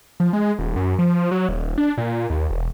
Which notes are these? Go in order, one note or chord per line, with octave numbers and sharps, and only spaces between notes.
F3
G#3
D#1
F#2
F3
F#3
D#1
D4
A#2
D#2
E1